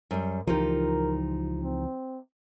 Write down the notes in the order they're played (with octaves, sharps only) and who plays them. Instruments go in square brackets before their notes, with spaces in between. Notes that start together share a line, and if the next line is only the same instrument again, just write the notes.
[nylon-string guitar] F#2 G3
[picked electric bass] C#2 E3 F3 [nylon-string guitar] D#4 F4 G4 [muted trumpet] A#4
[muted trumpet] C4